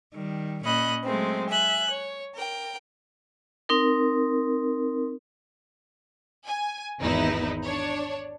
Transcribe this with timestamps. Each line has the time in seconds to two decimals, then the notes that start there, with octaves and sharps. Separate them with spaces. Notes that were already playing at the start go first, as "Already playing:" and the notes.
0.14 D#3 G3
0.63 A#2 C#4 D#5 B5 F#6
1.04 F#3 G#3 A3 C4
1.50 E5 G#5 F#6
1.89 C#5
2.35 A#4 G5
3.69 C4 D#4 A#4
6.47 G#5
7.01 G#1 E2 D#4 E4 B4
7.64 D4 C#5